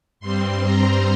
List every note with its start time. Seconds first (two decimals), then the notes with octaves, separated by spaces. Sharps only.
0.20 G2 G3 C4 C6
0.63 A#5